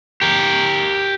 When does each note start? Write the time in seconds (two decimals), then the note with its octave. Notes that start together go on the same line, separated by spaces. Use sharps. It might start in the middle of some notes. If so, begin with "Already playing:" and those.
0.22 G4 A#4